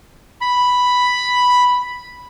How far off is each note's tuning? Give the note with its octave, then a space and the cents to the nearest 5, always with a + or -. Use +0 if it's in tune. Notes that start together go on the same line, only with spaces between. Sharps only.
B5 +0